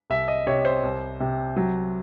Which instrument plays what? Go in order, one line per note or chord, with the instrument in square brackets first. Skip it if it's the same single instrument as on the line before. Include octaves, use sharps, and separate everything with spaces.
[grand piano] C2 E5
D#5
C3 C#5
C5
C2
C3
F#3